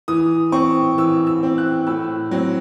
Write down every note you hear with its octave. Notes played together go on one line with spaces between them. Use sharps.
E3 D#6
C4 C#6
E3 E6
E6
C4
F#6
A2 E6
F#3 C4